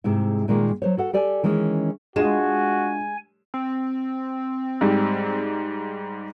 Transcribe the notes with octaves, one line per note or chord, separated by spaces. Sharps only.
G#2 C3 G#3 E4
A#2 D#3 G#3 A#3 F4
F#3 C5 C#5
F#4 A4 F#5
G4 A4 D5 G#5
D#3 E3 G#3 C#4
G#3 D4 F4 F#4 G#5 E7
C4
G#2 G3